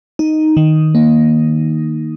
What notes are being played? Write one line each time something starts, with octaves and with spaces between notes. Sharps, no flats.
D#4
D#3
A#3